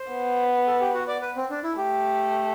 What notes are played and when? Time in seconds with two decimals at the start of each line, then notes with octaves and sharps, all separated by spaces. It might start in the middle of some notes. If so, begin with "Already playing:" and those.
Already playing: C5
0.11 B3
0.67 A4
0.80 G4
0.94 F#4
1.08 D5
1.21 B4
1.36 C4
1.50 D4
1.64 E4
1.77 A3 G4